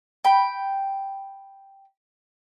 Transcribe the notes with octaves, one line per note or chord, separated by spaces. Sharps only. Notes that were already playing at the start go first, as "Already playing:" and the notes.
G5 B5